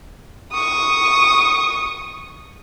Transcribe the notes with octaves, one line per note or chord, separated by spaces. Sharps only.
C#6 D#6